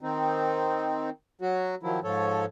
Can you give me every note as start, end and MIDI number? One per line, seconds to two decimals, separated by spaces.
0.01 1.10 51
0.01 1.10 60
0.01 1.10 63
1.41 1.75 54
1.41 1.75 66
1.83 2.00 51
1.83 2.00 53
1.83 2.00 54
1.83 2.00 64
2.04 2.45 44
2.04 2.45 53
2.04 2.45 69
2.04 2.45 73